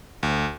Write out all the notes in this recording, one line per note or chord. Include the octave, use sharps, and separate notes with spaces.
D2